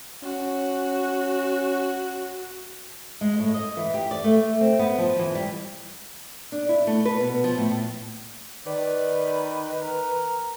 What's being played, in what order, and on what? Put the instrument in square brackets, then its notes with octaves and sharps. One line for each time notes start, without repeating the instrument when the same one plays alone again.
[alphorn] C#4 [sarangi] F#4
[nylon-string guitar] G#3
A2
D#5
E3
G4
D5
A3
C4
B3
F3
E3
G3
D4
E4
A3
B4
B2
F3
A2
A2
[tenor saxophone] D#3 [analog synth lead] B4 [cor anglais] D5
[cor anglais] A#4